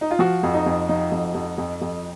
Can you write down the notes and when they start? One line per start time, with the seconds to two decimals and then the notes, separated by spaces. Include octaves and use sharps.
0.01 D#4
0.11 F4
0.19 F3 F#4
0.43 F2
0.54 D#4
0.66 F2
0.89 F3 D#4
1.12 F2
1.35 F2
1.58 F2
1.81 F2